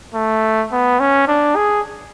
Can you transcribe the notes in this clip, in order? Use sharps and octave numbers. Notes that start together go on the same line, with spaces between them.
A3
B3
C#4
D4
G#4